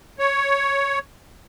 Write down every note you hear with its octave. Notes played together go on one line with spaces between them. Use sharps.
C#5